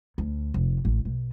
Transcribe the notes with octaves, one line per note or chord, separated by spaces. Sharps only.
D2
F1
A1
B1